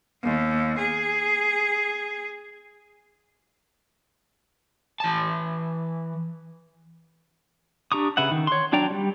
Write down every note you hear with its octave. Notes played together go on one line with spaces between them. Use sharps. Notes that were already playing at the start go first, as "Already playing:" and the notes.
D#2
G#4
E3 A5
D4 G4 A#5 C#6 D#6
C#3 B4 E5 F#5
D#3
C#5 C6
F#3 D4 D5 G5 A#5
G3